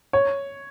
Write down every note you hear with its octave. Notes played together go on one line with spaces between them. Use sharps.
C#5